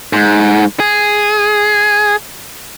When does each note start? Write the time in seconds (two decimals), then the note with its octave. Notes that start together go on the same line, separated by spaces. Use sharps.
0.13 G#2
0.80 G#4